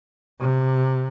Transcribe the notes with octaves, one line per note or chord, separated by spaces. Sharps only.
C3